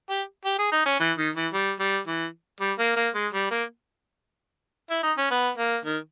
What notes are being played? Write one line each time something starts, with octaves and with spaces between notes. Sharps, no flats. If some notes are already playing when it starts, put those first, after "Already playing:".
G4
G4
G#4
D#4
C#4
E3
D#3
E3
G3
G3
E3
G3
A#3
A#3
G#3
G3
A#3
E4
D#4
C#4
B3
A#3
D#3